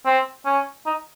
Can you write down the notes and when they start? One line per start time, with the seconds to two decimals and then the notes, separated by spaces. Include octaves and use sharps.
0.06 C4
0.46 C#4
0.86 D#4